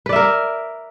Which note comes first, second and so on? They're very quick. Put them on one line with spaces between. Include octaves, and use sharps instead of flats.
B4 D5 E5 A#4